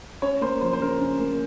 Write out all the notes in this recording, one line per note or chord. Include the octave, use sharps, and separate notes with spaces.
C#4 C#5
A#3 C5
F3 C5
C5
C#3 A#4
C#4
A#3